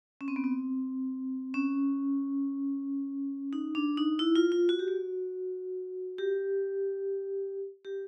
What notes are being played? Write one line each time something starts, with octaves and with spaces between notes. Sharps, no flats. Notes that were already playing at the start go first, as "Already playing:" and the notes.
C#4
C4
B3
C4
C#4
D#4
D4
D#4
E4
F4
F4
F#4
G4
F#4
G4
G4